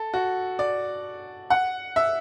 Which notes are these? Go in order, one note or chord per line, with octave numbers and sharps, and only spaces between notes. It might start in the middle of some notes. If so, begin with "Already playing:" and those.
Already playing: A4
F#4
D5
F#5
E5